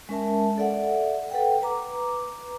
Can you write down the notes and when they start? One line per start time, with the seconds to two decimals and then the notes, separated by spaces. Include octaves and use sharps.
0.09 G#3 C#4 A#4 E5 A5
0.58 A4 D5 E5 F#5
1.31 A4 B4 F#5 G5
1.62 B4 A#5 D6